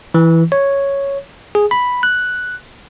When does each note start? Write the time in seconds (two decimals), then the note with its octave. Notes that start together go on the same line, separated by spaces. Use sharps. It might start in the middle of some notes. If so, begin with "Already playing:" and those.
0.14 E3
0.52 C#5
1.55 G#4
1.71 B5
2.03 F#6